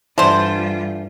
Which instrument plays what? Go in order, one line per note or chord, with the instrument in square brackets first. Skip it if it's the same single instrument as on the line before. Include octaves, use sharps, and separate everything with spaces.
[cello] G2 F4 [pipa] D3 C5 [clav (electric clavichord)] E3 D4